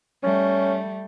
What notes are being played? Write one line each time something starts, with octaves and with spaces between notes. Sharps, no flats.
G3 A3 C#4